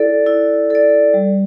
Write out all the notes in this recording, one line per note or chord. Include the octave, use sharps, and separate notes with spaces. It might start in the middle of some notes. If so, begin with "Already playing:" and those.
Already playing: E4 A4 D5
E4
A4 D5
G3